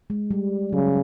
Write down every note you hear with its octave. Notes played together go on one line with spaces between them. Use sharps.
G#3
G3
C#3 F#3